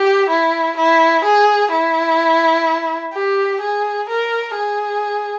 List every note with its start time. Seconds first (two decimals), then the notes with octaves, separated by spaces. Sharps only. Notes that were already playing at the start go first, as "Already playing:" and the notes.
Already playing: G4
0.30 E4
0.77 E4
1.24 G#4
1.72 E4
3.14 G4
3.61 G#4
4.09 A#4
4.56 G#4